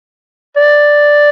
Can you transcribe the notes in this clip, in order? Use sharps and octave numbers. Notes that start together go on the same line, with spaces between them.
D5